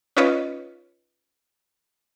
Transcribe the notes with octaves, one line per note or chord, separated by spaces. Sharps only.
C#4 D#4 F4 B4 C#5 D#5